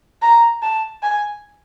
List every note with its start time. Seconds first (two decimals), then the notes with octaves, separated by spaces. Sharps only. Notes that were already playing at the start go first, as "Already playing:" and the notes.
0.22 A#5
0.63 A5
1.03 G#5